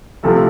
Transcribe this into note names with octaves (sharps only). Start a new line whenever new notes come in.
C2 C3 F3 A3 F4 A4